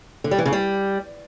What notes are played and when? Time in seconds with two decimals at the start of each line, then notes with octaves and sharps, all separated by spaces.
0.24 D3
0.31 G3
0.38 E3
0.45 C#3
0.53 G3